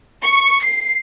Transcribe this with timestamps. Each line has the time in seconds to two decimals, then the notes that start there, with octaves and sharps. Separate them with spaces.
0.22 C#6
0.63 C7